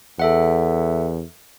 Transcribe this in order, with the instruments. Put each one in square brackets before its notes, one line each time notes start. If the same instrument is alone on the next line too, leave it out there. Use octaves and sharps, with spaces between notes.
[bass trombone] E2 [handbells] A4 E5 F#5